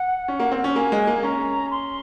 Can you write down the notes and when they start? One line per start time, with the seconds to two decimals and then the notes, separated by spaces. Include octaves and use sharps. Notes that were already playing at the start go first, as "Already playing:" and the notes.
Already playing: F#5
0.28 C#4
0.40 A#3
0.52 C4
0.64 C#4
0.76 A#3 G#5
0.92 G#3
1.07 A#3
1.23 C#4 A#5
1.71 C6